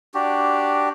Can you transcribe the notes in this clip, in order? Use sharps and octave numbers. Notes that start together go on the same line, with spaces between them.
D4 F#4 G4